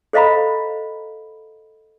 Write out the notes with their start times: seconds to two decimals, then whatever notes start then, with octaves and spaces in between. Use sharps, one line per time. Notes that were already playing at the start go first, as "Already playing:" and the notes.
0.13 A4 C5 D#5 F5 A#5 B5